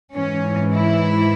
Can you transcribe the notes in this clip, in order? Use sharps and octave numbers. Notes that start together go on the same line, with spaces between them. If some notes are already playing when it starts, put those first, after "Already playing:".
G#2 E3 C#4
E4